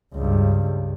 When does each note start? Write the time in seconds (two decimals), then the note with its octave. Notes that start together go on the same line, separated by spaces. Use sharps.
0.15 C#2 G2